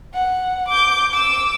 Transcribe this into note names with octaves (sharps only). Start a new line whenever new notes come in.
F#5
D6 G6
D6 E6